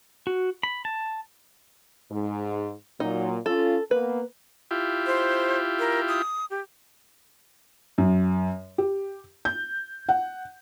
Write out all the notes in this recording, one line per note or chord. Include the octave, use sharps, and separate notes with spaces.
F#4
B5
A5
G#2
A#2 F#3 D#4
C#4 F4 A4
A#3 B3 B4
E4 F4 G4
C5
A#4
D#6
G4
F#2
G4
G6
F#5